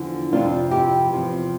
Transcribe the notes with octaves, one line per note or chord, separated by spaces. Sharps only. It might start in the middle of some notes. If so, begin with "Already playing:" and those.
Already playing: E2 D3 F3
F2 C3 F3 D4 F4
E4 G4
E2 C3 F3